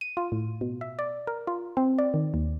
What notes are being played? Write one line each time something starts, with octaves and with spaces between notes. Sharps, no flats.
D#7
F4
A2
B2
E5
D5
A#4
F4
C4
D5
D#3
D#2